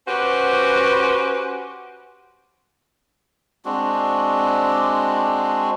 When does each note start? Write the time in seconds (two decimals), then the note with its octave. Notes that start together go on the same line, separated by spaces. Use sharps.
0.08 C#4 F#4 G4 B4 C5
3.65 G#3 C4 D4 F#4